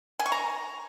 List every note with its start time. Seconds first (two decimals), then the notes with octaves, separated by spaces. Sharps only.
0.19 G#5
0.26 C#6
0.32 A#5